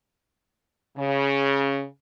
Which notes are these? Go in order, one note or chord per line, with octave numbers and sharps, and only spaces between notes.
C#3